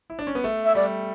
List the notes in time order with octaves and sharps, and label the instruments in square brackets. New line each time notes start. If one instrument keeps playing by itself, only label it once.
[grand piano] E4
D4
C#4
B3
A3
[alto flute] E5
[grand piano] G3 [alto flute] D5